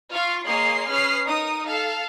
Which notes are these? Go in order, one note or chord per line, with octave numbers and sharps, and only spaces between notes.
F4 F5 C#6
A#3 G#4 C#5 D#5 C6 C7
C#4 B4 D#6 F6 C7
D#4 A#4 D#6
A4 F5